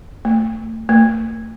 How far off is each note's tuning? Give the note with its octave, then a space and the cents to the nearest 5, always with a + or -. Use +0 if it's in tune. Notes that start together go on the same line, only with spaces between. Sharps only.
A3 +25
A3 +35